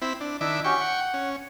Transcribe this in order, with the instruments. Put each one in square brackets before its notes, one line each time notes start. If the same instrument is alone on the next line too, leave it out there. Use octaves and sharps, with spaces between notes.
[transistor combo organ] C4 E4 B5
D4
[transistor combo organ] D#3 E4 D6 [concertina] D4 E5
[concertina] C#4 F#4 G4 [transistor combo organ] G5 C#6
[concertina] F#5
[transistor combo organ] C#4